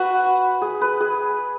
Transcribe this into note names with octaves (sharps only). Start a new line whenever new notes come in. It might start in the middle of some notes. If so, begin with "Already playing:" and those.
Already playing: F#4 B4
G#4
B4
G#4